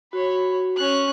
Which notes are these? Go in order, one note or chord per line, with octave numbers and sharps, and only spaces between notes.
F#4 C#5 B5
C#4 F#6